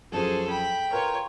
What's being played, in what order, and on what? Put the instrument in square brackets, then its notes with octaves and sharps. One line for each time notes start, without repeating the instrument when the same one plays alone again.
[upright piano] F#2 F3 [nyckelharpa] C#4 G#4 [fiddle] A4 C5
[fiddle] G5 [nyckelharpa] B5
[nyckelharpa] F4 C#5 [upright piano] A#4 B4